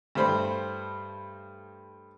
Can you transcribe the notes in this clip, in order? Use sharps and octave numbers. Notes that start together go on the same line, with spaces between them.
G2 A3 C5 B5